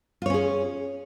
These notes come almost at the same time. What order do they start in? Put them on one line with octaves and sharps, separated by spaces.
F4 C#5 C#4 G#4